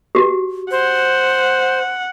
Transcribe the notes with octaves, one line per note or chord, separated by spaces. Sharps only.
F#4 G4
C5 F#5